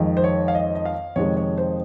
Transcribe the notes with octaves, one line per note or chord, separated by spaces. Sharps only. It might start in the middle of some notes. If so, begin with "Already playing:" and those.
Already playing: F2 D#3 G#3
C5
C#5
F5
D#5
D#5
F5
F2 C3 D#3 G#3 C#5
C#5
C5